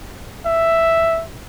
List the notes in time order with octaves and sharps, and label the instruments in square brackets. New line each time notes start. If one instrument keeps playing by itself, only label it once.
[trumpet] E5